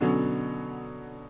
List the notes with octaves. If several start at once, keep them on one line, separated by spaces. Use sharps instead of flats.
B2 D3 F#3 B3 C#4